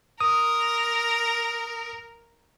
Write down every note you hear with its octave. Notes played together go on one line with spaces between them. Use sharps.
A#4 D#6